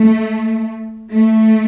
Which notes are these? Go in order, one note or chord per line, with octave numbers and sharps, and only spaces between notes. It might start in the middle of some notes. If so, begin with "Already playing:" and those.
Already playing: A3
A3